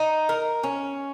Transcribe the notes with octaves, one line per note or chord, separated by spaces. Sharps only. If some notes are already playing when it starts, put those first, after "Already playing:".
Already playing: D#4
A#4
C#4